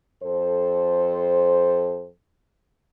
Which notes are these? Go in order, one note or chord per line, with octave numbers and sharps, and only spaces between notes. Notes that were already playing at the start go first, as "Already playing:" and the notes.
F2 A4 C5